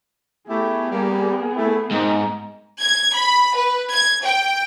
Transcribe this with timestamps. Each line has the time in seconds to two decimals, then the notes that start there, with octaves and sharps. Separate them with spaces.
0.49 A3 B3 E4 G4 G#4
0.92 G3 A#3
1.57 A3 E4
1.91 G#2 A#3 C4 D#4
2.80 G#6
3.14 B5
3.56 B4
3.92 G#6
4.24 G5